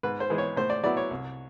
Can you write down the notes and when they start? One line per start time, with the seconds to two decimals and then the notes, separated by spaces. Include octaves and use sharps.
0.03 G#2 B4
0.20 C5
0.30 E3 G#3
0.38 C#5
0.57 A2 C5
0.70 D5
0.83 F#3 B3 E4 D5
0.97 C#5
1.11 C2